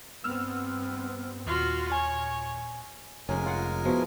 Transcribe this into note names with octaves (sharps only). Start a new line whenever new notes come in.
G2 B3 C4 E6 F6
D#2 A#2 F4 F#4
C#5 G#5
F1 G#3 C#4 A#4 G#5
F4 F#5
B2 F3 E4